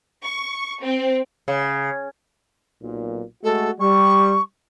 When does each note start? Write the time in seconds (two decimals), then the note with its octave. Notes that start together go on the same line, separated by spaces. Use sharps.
0.24 C#6
0.84 C4
1.48 C#3
2.82 B1 A#2
3.43 G#3 A3 F#4 A4
3.79 G3 C#6